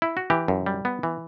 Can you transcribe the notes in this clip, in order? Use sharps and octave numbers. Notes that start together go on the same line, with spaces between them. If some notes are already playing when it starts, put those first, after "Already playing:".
E4
F#4
E3 G4
F#2
G3
B3
E3